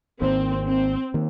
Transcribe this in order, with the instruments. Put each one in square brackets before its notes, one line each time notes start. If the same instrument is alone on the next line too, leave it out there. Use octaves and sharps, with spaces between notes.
[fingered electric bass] G#1 G#2 D#3 A#3 [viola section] C4
[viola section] C4
[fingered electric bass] D#3 A#3